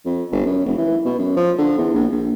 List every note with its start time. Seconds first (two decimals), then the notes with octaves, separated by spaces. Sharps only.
0.05 F2
0.31 G1
0.46 F#2
0.66 F1
0.78 E3
1.05 B2
1.19 F#2
1.36 F3
1.58 D3
1.78 E2
1.94 A#1
2.12 A#1